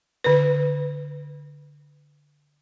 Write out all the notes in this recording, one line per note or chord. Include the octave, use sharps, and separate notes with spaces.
D3 B4